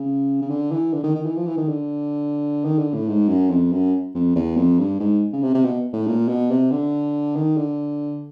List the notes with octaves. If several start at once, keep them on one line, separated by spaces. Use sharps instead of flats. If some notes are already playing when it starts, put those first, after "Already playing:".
Already playing: C#3
C#3
D3
E3
D3
D#3
D#3
E3
F3
E3
D#3
D3
D#3
D3
A2
G#2
F#2
F2
F#2
F2
E2
F2
G2
G#2
C#3
C3
C3
B2
A2
A#2
B2
C3
D3
D#3
D3